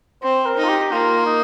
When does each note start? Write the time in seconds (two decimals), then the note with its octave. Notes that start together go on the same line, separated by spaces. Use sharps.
0.23 C4 C5
0.46 A#4
0.57 D#4
0.64 F4
0.69 G4
0.92 A#3 F4
1.26 D#4